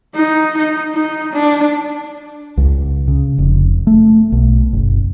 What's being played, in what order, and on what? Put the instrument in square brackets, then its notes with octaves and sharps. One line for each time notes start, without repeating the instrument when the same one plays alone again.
[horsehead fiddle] D#4
D#4
D#4
D4
[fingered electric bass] C#2
C#3
F1
A3
B1
F#1